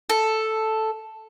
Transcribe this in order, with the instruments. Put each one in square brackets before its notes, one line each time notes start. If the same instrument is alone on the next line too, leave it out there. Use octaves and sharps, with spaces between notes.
[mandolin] A4